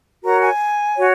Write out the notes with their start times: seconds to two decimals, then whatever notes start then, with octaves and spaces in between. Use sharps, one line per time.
0.24 F#4 A#4 C#5 A#5
0.42 G#5
0.96 F#4 C#5